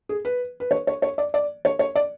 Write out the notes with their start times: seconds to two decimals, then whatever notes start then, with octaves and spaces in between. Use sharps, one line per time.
0.09 G#4
0.25 B4
0.60 B4
0.71 C#5
0.87 C#5
1.02 C#5
1.18 D5
1.34 D5
1.65 C#5
1.79 C#5
1.96 D5